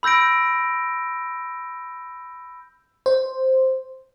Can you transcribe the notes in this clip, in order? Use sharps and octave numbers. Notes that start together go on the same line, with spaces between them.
B5 E6 G6 A#6 D7
C5